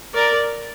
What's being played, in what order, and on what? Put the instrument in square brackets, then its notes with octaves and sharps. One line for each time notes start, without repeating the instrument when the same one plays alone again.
[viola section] A#4 D5